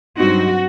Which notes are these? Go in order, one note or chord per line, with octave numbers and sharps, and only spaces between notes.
G2 F#3 C4 D#4 F#4